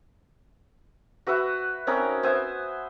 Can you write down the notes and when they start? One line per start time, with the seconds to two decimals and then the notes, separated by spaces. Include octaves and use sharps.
1.27 F#4 B4 E5 F#5
1.87 C4 C#4 D#4 A#4
2.23 B3 C5 E5 G#5